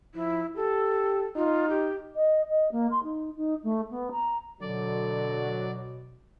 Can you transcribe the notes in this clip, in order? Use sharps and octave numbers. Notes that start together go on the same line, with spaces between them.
F3 E4
G4 A4
D#4 F4
G4
D#5
D#5
A#3
C6
D#4
D#4
A3
B3
A#5
B2 D3 F#3 D5